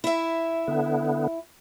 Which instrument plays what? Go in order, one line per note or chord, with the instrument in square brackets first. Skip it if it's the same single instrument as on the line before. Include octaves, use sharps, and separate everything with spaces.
[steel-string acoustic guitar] E4 E5
[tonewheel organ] D3 B3